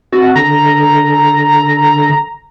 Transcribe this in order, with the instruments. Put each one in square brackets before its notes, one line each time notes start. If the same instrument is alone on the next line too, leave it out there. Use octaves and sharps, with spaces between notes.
[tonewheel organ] C4 E5 A5 [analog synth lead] F#4
[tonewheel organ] D3 A4 [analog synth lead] A#5